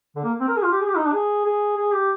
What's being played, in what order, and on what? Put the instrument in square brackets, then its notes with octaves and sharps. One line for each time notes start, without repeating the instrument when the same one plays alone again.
[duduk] D3
A#3
C4
A#4
G#4
F4
G4
G#4
G4
D#4
D4
G#4
G#4
G#4
G4